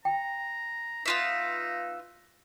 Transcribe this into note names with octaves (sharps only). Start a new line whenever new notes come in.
G5 A#5
B3 D#4 F4 E5